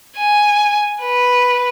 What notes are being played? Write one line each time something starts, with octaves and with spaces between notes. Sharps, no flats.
G#5
B4